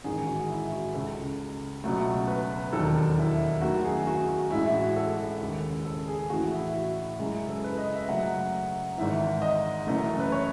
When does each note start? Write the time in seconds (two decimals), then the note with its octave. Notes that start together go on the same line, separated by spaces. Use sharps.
0.04 A1 G#2 D#3 G#3 G#4
0.27 F#4
0.49 E4
0.72 F#4
0.94 C#2 C#3 G#3 A4
1.84 C#2 B2 F#3 A3
2.27 B4
2.73 E1 D#2 D#3 F#3 A4
3.18 E4
3.62 F#2 D#3 A3 F#4
3.85 G#4
4.07 F#4
4.29 F#4
4.51 A1 A2 G#3 E4
4.66 E4
4.74 F#4
4.96 A4
5.41 D#2 C#3 G#3
5.85 A4
6.08 G#4
6.30 A1 A2 E3 A3 F#4
6.52 E4
6.74 F#4
7.19 F#2 C#3 G#3 E4
7.49 A4
7.64 B4
7.78 D#5
7.93 E5
8.09 F#2 C#3 F#3 A3 F#5
8.98 G#1 G#2 E3 E5
9.42 D#5
9.87 F#1 F#2 E3 A3
10.20 B4
10.32 C#5